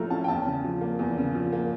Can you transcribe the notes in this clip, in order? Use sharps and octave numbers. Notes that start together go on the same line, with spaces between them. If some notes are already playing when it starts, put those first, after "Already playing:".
Already playing: A2 F3 A3 A#5 F6
C#4 A5
G5
E2 A5
C#3
F3
A#3
E2
C#3
F3
A#3